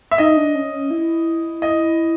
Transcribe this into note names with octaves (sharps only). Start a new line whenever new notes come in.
E5
D#4 D#5
D4
C#4
C#4
E4
D#5